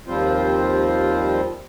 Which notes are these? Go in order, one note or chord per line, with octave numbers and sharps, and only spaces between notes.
D#2 F3 G3 C4 F4 C5